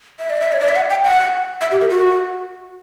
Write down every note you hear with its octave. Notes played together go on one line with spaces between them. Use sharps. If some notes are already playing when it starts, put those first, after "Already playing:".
E5
D5
E5
C#5
D5
E5
F#5
G5
F#5
E5
G4
A#4
F#4